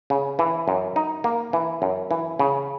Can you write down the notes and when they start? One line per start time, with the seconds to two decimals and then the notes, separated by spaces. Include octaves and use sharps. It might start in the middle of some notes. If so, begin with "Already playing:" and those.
0.10 C#3
0.39 E3
0.68 F#2
0.96 D#4
1.24 A#3
1.53 E3
1.82 F#2
2.11 E3
2.39 C#3